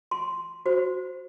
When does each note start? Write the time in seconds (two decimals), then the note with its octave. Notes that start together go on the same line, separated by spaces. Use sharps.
0.11 C6
0.66 F#4 C5